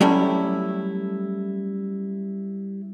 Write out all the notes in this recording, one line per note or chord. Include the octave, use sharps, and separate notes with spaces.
F#3 G3 A3 C#4 E4